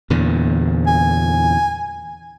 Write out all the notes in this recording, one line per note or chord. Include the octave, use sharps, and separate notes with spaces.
E2 A#2 D3
G#5